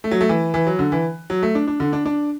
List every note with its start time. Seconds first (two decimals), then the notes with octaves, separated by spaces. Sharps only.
0.04 A3
0.11 F#3
0.21 A3
0.29 E3
0.54 E3
0.67 F#3
0.79 D3
0.92 E3
1.30 F#3
1.43 A3
1.55 D4
1.67 D4
1.80 D3
1.93 D4
2.05 D4